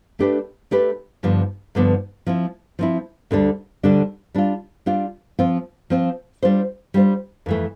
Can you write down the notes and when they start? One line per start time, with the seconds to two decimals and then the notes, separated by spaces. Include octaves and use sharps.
0.19 A3 D4 G4 B4
0.71 A3 D4 G4 B4
1.23 G2 D3 F3 B3
1.75 G2 D3 F3 B3
2.26 F3 C4 E4
2.79 F3 C4 E4
3.31 D2 D3 G3 D4
3.83 D2 D3 G3 D4
4.34 G3 D4 F4
4.86 G3 D4 F4
5.39 F3 C4 F4
5.90 F3 C4 F4
6.43 G3 D4 F4 C5
6.94 G3 D4 F4 C5
7.46 F2 E3 A3